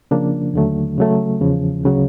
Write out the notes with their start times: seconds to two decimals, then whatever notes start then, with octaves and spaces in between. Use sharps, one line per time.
0.11 C#3 F3 A#3 D4
0.54 D#2 D3 F#3 A3
0.98 C#3 F#3 A3
1.41 E2 C#3 F3
1.83 D2 C#3 F#3